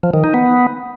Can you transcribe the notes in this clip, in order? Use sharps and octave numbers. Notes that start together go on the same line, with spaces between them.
F3
D#3
D#4
B3